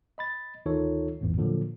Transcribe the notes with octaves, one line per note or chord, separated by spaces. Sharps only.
D#5 B5 A6
D2 D#3 D#4 F4 A4 C#5
A1 E2 G#2
A#2 D3 F3 F#3